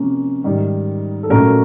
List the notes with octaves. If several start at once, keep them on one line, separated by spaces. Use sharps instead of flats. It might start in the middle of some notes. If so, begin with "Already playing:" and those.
Already playing: C3 F3 A#3 C#4
G#2 D#3 G3
A4
A#2 F#3 A3 C#4 A#4